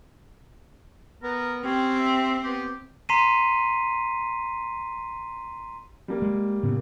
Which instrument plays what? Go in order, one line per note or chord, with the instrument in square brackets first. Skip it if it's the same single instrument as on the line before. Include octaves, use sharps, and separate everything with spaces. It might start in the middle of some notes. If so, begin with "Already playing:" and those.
[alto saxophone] B3 [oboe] A#4
[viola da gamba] C4 [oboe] C#4 [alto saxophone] G4
[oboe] E5
[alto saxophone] B3 [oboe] G4
[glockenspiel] A#5 C6 B6 C7 D#7
[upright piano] G3 A#3
[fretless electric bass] G#3
A2 C#3 B3